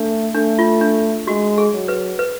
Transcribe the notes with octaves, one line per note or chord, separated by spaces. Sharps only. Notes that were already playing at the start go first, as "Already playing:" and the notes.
Already playing: A3 D4
A3 D4
F4
D4
G#3 F#4
G#4
F#3
B4
B4